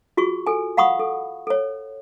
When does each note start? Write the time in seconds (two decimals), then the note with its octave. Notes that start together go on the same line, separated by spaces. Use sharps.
0.17 F4 F#4 G#4 C#6
0.47 A4 G#5
0.77 F5 F#5 B5 C#6 D#6
0.99 A4
1.47 A4 C#5